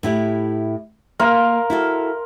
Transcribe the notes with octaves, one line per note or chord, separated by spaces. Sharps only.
A2 E4 G4
A#3 A#4 F5 C6
E4 F#4 A4